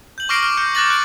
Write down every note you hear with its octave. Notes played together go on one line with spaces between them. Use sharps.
G6 F#7
C#6 D6 F6 A#6 C7 D7
D6 F6
F6 G6 C#7
D6 F#6 G6 A6 A#6 F#7
F#6 D7 F#7